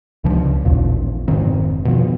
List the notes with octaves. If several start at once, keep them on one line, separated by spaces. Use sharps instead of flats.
C#2 C#3 F3 D4
A1 D#2 A#2
F1 G#2 D#3 C4
B2 F3